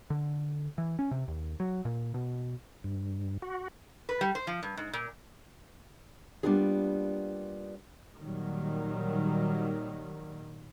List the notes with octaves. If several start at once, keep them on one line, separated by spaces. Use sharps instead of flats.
D3
E3
C#4
C3
D#2
F#3
A#2
B2
G2
F#4
B4
G3
C5
F3
G2
G#2
A#2
G3 A#3 B3 D4 F4 G#4
A#2 D#3 F#3 G3